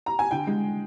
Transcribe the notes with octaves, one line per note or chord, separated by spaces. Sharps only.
A#5
G#5
D3 G5
G#3